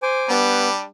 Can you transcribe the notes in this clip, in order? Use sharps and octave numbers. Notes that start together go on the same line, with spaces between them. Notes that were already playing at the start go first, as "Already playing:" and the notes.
C5 G#5 D6
G3 B3 D4